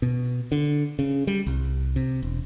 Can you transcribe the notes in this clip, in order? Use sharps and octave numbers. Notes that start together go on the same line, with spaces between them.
B2
D3
C#3
G3
C2
C3
E1